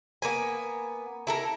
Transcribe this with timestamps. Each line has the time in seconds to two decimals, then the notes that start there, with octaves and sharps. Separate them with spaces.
0.22 A#3 B3 G#5
1.27 E4 A4 A#4